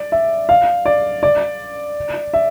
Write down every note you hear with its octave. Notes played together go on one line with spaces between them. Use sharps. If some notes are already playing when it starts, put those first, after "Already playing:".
Already playing: D5
E5
F5
D5
D5
E5